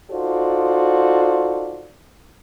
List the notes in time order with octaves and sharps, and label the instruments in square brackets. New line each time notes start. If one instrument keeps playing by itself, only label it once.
[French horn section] D#4 F4 F#4 A4 C5 D5